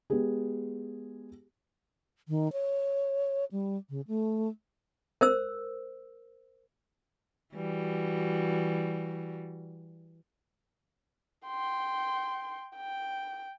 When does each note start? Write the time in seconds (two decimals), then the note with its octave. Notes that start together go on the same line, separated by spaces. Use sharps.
0.10 G#3 B3 G4 G#4
2.29 D#3
2.53 C#5
3.52 G3
3.90 C#3
4.08 A3
5.21 A#4 C5 E6
7.53 E3 G3 F#4
11.46 G5 C6
12.77 G5